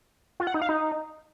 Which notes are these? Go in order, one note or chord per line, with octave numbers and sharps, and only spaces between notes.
F4
F#5
D#4
F5
D#4